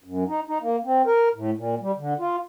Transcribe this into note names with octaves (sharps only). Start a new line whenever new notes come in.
F#2
D#4
D#4
A#3
C4
A#4
A2
A#2
G3
D3
F4